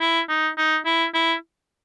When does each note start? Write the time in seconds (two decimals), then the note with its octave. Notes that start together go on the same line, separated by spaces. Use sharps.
0.01 E4
0.29 D#4
0.58 D#4
0.86 E4
1.14 E4